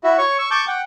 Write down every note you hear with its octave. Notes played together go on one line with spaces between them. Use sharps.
E4 F#4 E5
C#5 C#6
C#6 E6
A5 C#6 D6 G6
F#5 G5